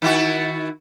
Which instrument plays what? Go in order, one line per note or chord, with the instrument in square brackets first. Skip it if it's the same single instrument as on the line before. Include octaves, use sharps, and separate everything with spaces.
[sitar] D#3 E4 F#4